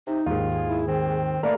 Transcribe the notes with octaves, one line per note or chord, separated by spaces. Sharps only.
C3 D#4
D#2 G#2 D#3 F4
G#4
E4
D#3 C4
A3 A#3 A#4 B4 D5